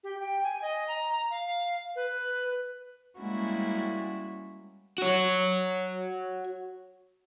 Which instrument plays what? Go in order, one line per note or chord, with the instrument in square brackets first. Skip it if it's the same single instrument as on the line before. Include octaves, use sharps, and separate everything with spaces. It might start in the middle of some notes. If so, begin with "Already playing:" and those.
[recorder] G4
G5
G#5
D#5
A#5
A#5
F5
B4
[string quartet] G3 G#3 A#3 C#4 E4 F#4
[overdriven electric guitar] F#4 C#5